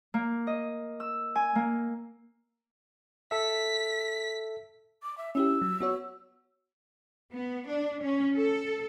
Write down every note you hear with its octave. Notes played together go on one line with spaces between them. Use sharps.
A#3
D#5
E6
G#5
A#3
A4 E5 B6
D6
E5
C#4 E4 G4 E6
F#3
B3 F#4 C#5
B3
D4
C#4
A4